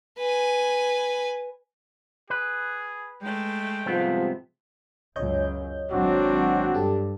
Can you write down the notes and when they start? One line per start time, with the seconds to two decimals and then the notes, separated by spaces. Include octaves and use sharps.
0.18 B4 G#5
2.30 G#4 B4
3.23 G#3 A3 G5
3.86 G#2 C3 F3 G3 B3 C4
5.16 C#2 F#2 C#5 D#5 G6
5.92 G#1 F#3 C4 D4 F#4
6.74 G2 G4 A4 A5